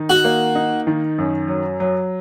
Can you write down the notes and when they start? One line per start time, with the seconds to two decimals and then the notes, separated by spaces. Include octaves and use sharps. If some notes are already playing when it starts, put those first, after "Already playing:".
Already playing: D#3 D#4
0.10 F#4
0.24 A#3
0.55 D#4
0.87 D#3
1.18 F#2
1.48 F#3
1.80 F#3